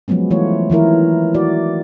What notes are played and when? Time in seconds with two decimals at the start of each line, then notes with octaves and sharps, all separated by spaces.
0.08 F3 F#3 G#3 B3 C#4
0.31 E3 A3 F4 C#5
0.70 D#3 E3 E4 A#4
1.35 F#4 D5